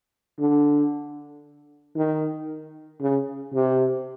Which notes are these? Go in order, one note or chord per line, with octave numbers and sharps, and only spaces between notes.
D3
D#3
C#3
C3